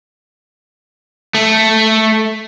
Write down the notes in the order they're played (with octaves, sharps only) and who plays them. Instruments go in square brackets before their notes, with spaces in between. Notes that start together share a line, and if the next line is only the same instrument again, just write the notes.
[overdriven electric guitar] A3